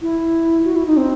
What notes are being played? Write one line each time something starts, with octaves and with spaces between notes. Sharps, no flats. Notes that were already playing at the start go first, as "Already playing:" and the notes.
E4
F#4
E4
D#4
C4